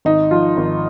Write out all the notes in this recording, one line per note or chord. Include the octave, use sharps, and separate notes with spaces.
G#1 D#4
F3 F4
G#1